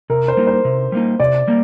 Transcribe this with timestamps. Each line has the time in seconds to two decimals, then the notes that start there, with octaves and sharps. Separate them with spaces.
0.10 C3 A#4
0.28 C5
0.37 G3 A#3 D#4
0.47 C5
0.65 C3
0.92 G3 A#3 D#4
1.20 C3 D5
1.47 G3 A#3